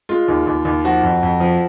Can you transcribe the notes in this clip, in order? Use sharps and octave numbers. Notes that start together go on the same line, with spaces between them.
G#3 F4
D#2
D#2
D#2
F3 F#4
F2
F2
F3